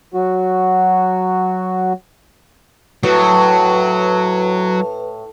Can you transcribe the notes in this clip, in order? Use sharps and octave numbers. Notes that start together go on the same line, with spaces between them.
F#3 F#4
A2 F#3 B4